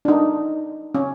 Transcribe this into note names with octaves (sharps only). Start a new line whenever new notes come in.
D4
D#4
C#4